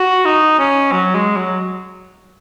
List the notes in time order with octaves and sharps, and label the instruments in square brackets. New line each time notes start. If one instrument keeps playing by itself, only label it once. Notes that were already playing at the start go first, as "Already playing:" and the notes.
Already playing: [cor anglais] F#4
D#4
C#4
F#3
G#3
F#3